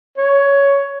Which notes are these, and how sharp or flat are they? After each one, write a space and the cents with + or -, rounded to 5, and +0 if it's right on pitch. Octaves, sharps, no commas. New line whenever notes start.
C#5 +10